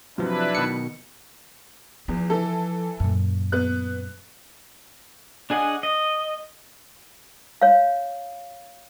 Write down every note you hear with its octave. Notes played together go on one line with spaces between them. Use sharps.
C3 F3 F#3 D4 E4 B4
B2 D#3 C#7
E2 F3
E3 A4
F#2 A#2
B3 F#6
D4 G#4 D#5 F#5 G#5
D#5
C#5 F5